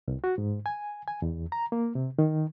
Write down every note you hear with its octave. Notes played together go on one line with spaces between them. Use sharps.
C2
F#4
G#2
G#5
G#5
E2
A#5
A#3
C3
D#3